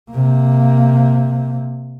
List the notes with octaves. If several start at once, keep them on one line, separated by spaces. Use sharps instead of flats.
C3 A#3